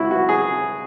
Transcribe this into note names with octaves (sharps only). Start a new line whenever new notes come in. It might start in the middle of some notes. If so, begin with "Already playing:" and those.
Already playing: C#3 G#3 E4 F#4
F#4
G#4